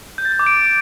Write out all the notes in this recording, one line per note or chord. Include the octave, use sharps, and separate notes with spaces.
G6
A6
G6
D6
D7